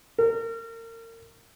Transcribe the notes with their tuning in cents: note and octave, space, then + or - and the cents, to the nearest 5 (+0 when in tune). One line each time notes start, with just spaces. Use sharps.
A#4 -35